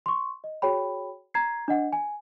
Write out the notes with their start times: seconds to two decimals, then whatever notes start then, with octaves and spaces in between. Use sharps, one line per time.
0.06 C6 C#6
0.44 D#5
0.62 F#4 G#4 C#5 G5 B5
1.34 A#5 G#6 C7
1.68 D4 D#5 F#5
1.93 G#5